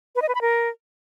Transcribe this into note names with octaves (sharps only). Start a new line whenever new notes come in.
B4
D#5
B4
B5
A#4